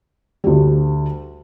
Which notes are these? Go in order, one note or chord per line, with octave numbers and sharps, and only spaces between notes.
D2 G3